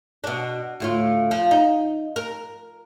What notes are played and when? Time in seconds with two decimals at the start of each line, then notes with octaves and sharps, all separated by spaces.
0.24 B2 D4
0.80 D2 A2 F4
1.31 F3
1.51 D#4
2.16 A#4